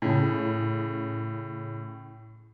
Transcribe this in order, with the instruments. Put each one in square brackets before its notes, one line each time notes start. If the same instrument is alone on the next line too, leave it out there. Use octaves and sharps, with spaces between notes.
[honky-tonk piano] A2 C#3